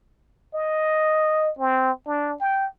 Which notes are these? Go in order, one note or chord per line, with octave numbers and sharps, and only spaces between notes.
D#5
C4
D4
G5